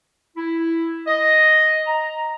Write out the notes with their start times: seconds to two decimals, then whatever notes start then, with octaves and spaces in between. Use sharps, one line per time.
0.37 E4
1.07 D#5
1.87 A#5